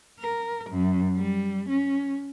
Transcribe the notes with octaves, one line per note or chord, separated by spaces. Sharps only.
A#4
F#2
G3
C#4